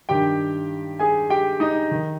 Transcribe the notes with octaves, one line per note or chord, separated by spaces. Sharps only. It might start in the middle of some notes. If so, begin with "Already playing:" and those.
G2 D#3 G4 G5
G#4 G#5
G4 G5
D#4 D#5
D#3